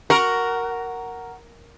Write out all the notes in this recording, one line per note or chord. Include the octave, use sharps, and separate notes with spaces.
F#4 A#4